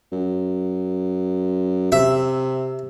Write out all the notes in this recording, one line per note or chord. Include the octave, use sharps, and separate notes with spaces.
F#2
C3 E5